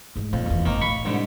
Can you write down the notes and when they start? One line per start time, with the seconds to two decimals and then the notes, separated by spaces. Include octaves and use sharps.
0.16 G#2 G#3
0.33 F2 A#2
0.46 F#1 E2
0.66 G#1 D#3 A#3
0.81 A2 B5 C#6
1.05 C2 G#2 D3